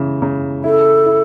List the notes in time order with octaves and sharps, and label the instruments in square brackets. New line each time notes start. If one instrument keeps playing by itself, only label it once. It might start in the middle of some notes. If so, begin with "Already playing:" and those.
Already playing: [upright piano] C#3 E3
C#3
[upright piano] E4 [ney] A4
[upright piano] E4